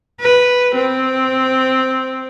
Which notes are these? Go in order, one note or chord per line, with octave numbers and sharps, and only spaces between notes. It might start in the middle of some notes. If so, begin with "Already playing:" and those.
B4
C4